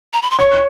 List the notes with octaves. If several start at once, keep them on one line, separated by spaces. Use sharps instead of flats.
A#5
B5
C6
C#5 C#6